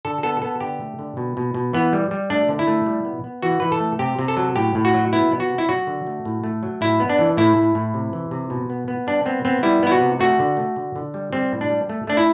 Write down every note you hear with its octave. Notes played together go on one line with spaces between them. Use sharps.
D3 A4
B3 A4
B3 A4
D3 G4
A3
D3
B2
B2
B2
E3 B3
G3
G3
A3 D4
D3
E4
A3
G3
B3
B3
E3 F#4
E3 B4
A4
A3
C3 G4
C3
A4
F#3
A2 G4
A2
F#4
F#3
B3 E4
B3
F#4
C3
E4
F#3 F#4
D3
A3
A2
A3
F#3
A2 E4
B3
D4
E3
A2 E4
A2
A2
C3
E3
C3
B2
B3
B3
G3 D4
B3 C4
B3 C4
G3 E4
B3 E4
F#4
C3
A3 F#4
D3
A3
D3
D3
G3
G3 C4
A2
D4
G3
A3
A3 D4
E4